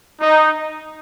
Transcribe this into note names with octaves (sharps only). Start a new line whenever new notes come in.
D#4